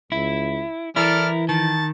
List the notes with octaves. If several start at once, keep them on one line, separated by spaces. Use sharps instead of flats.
C#2 E4
E3 E4 A4 A#4 D5 F6
D#3 A5